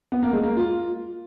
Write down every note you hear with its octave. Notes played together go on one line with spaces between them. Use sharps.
B3
A#3
G#3
A#3
F4